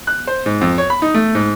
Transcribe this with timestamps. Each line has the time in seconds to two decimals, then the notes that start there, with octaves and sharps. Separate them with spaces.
0.07 F#6
0.27 C5
0.46 G#2
0.61 F2
0.78 C#5
0.90 B5
1.02 D#4
1.14 A3
1.35 G#2